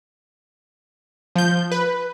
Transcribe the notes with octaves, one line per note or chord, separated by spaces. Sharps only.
F3 G6
B4